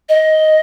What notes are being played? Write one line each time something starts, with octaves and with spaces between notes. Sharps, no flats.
D#5